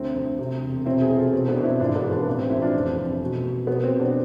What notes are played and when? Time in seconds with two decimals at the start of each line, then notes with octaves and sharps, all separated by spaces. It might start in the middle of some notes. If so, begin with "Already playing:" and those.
Already playing: D2 C4
0.15 D2
0.39 C3
0.63 E1
0.85 B2 C4 E4
1.01 E4 G#4
1.09 B2
1.17 F4 A4
1.32 B2 C4
1.48 B3 D4
1.57 B2
1.64 C4 E4
1.80 G#1 D4 F4
1.95 B3 D4
2.03 E3
2.11 B3 D4
2.27 A1
2.39 C4
2.50 E3 C4 E4
2.62 D4 F4
2.73 F1 C4
2.97 F1
3.21 B2
3.44 B2
3.67 B2 B3
3.84 C4
3.91 B2
3.99 B3 D4